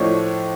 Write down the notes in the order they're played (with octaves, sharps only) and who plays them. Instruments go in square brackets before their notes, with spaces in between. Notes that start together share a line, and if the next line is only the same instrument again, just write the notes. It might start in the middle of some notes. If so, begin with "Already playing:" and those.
Already playing: [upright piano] A2 F3 A3 D4 C#5 D#5